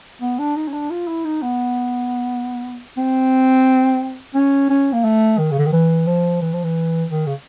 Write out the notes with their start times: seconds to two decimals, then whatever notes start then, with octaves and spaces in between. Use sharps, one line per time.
0.22 B3
0.39 D4
0.56 D#4
0.68 C#4
0.73 D4
0.91 F4
1.07 E4
1.25 D#4
1.42 B3
2.97 C4
4.35 C#4
4.70 C#4
4.93 A#3
5.04 A3
5.38 D#3
5.51 C#3
5.59 D3
5.66 D#3
5.73 E3
6.07 F3
6.41 E3
6.53 F3
6.64 E3
7.10 D#3
7.27 C#3